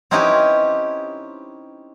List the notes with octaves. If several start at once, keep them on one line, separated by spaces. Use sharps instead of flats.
C4 C#4 D#4 E4 G4 B4